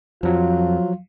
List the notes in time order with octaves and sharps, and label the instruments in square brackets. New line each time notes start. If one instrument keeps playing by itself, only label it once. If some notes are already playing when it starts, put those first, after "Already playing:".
[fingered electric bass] F2 [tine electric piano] F3 F#3 [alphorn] F4